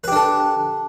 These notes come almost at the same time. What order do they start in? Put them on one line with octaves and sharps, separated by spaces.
B4 G4 D4 A4